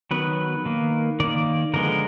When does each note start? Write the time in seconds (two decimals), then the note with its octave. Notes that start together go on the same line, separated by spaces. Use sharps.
0.11 D#3 F#3 B3 B4
0.65 D#3 A#3
1.20 D#3 A#3 D5
1.74 D3 F3 G#3 B3 A#4